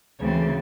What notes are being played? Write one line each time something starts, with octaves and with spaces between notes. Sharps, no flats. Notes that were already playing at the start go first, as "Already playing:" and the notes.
D2 C#3 E3 A3 C4 C#5